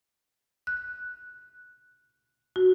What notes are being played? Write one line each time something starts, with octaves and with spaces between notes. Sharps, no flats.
F#6
F#4